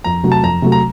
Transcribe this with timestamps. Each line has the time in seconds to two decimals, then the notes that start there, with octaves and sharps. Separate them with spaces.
0.04 F2 A#5
0.23 C3 F#3 A3
0.32 A5
0.43 F2 A#5
0.62 C3 F#3 A3
0.72 A#5